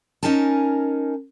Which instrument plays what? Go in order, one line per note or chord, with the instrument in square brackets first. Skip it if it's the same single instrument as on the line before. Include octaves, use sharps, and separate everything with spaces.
[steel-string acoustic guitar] C#4 D#4 A#4 G#5 A5